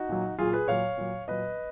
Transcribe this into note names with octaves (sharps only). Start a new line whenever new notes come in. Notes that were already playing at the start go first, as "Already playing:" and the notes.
Already playing: D#4 F#4
A#2 F#3
A#2 F#3 F4 G#4
G#4 B4
A#2 F#3 C#5 F5
A#2 F#3
A#2 F#3 B4 D#5